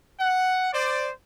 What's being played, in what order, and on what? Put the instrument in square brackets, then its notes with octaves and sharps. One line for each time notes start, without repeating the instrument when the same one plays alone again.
[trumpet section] F#5
C5 D5